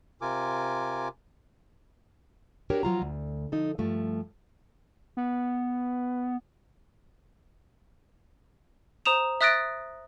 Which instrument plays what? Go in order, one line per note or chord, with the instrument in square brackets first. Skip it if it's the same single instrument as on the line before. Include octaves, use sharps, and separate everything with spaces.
[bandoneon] C3 F4 A#4 G#5 D6
[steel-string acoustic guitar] D4 F#4 G4 A#4 C#5
F3 F#3 F4 A#5
D2
F3 D#4 A4
G2 F3 A3
[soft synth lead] B3
[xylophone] C5 A#5 D#6 E7 F7
E5 D#6 F#6 A6 A#6 D7